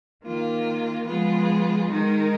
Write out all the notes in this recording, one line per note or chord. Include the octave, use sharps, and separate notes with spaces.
D#3 A#3 F4
F3 G#3 B3 F4 G#4
D#3 G#3 D#4 A#4